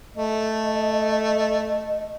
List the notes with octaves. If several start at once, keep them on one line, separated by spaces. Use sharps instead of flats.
A3 D#5